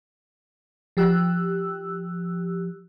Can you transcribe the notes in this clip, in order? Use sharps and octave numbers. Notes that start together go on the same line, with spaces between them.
F3 G4 E6 F#6